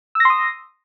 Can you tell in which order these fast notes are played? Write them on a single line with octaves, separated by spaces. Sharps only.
E6 A#6 C6 D#6